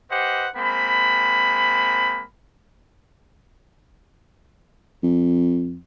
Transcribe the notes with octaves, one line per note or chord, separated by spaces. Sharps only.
G4 B4 C5 D#5 F#5
G#3 A#3 C4 B5
F2